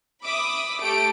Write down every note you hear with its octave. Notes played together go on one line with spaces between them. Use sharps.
E5 B5 D6 D#6
A3 G4 D7